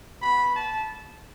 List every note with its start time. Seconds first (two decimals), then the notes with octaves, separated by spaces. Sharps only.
0.20 B3 F#4 B5
0.54 A5